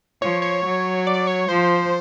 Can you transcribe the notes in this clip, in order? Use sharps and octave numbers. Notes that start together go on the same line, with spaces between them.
F3 C#5
C#5
F#3
D5
C#5
F3 C5